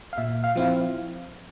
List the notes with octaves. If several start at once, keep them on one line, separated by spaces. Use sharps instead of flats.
F5
A#2 E5
F5
F3 C4 E4 F5